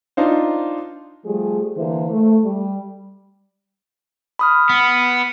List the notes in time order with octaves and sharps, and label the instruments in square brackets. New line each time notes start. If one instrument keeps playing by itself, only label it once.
[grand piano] D4 D#4 F4 C5
[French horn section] F3 G3 A3 G#4
D3 E3 A#3 C5
A3
G3
[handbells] B5 D#6 F6
[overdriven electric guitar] B3